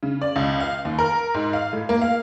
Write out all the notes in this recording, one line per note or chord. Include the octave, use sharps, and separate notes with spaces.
C#3
D5
C#2
F5
D#2
A#4
G#2
F5
A2
A#3
F5